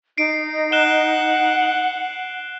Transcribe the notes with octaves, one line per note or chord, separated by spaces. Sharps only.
D#4 C7 D7
F#5 F#6 E7 G7